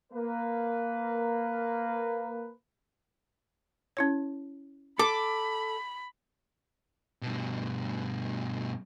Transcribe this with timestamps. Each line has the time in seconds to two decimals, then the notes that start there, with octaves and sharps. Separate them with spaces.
0.12 A#3 A#4 B4
3.97 C#4 E4 C#5
4.99 A4 B5 D6
7.22 G2 B2